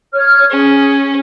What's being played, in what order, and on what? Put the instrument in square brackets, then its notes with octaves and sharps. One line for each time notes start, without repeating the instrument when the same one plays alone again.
[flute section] C#5 F6
[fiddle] C#4 [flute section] G#4